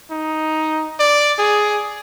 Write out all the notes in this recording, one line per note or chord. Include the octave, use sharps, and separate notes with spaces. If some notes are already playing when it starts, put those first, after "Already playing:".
D#4
D5
G#4